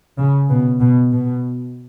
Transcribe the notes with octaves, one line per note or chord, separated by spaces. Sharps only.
C#3
B2
B2
B2